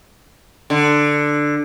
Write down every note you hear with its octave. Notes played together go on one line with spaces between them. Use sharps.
D3